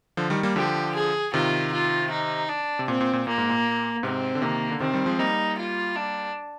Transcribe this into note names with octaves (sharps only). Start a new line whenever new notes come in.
D3 F3
D#3 G3
G3 A#3
D3 F3 G4
G#4
C3 D#3 F4
F4
D#4
D4
C3
A#2 C4
A#2
A#2
A#2 A#3
G#2
A#2
G#2 C3 C4
D3
C3 D#3 A#3
D3
C3 D#3 C4
D#3 G3
F3 G#3
G3 A#3 D#4
F4
D4